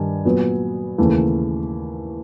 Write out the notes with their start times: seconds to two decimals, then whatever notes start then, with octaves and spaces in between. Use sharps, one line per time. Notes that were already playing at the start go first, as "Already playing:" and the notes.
Already playing: G2 D#3 G3 D4 G#5
0.25 A#2 F#3 B3
0.98 D#2 C#3 E3 A3